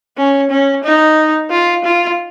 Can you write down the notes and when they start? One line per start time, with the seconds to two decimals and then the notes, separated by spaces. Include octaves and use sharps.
0.17 C#4
0.50 C#4
0.84 D#4
1.51 F4
1.84 F4